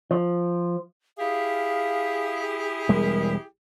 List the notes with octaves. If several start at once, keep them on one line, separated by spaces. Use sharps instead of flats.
F3
E4 G4 G#4 F5
E1 G3 G#3 A#4